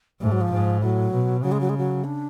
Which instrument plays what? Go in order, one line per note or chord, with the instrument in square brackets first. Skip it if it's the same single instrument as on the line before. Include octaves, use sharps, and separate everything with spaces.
[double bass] G#2 [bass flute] A3
[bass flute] F#3
F3
[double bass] G#2
[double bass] A2 [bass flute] F#3
[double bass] B2
[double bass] C#3 [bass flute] F#3
[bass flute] G#3
F#3
G#3
F#3
D4